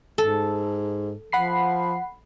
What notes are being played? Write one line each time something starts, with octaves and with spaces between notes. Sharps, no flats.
G#2 A4
F3 F#5 B5 C7